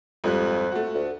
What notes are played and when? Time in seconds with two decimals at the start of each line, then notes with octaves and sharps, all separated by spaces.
0.24 G#1 F2 G3 F#6
0.72 A3 F#4
0.94 D2